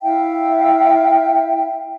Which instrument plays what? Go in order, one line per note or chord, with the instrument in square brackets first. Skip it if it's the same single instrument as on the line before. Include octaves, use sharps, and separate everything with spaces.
[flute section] E4 E5 F5 G5